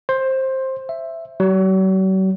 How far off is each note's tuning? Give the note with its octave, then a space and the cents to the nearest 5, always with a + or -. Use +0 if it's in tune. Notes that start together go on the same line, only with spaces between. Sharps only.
C5 +15
E5 +5
F#3 +45